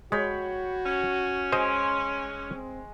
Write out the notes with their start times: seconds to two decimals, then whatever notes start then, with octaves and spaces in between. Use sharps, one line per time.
0.12 G#3 F#4 C#5 G5 B5
0.86 C#4
1.52 G#3 C5 D#5
2.48 C4